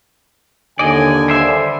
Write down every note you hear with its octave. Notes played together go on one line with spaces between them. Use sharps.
D#2 D3 D5 D#5 G#5
G3 C5 E5